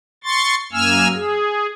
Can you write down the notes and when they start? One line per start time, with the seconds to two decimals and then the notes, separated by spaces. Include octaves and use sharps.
0.24 C6 C#6 A6
0.72 F#2 A#3 G#5 E6 F6
1.13 G#4